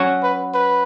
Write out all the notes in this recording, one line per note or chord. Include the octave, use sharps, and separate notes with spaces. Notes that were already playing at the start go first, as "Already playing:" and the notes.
Already playing: F#3 C#4 F#4
B4
B4